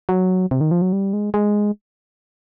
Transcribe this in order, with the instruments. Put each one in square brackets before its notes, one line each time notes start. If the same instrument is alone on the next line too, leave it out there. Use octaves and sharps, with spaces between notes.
[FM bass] F#3
C3
D#3
F3
F#3
G3
G#3
G#3